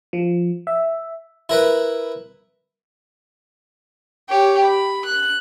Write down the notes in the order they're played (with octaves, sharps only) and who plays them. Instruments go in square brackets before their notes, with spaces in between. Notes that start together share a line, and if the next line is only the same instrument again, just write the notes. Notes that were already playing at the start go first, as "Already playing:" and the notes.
[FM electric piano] F3
E5
[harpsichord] E4 A#4 B4
[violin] G4 C#5
B5
F#6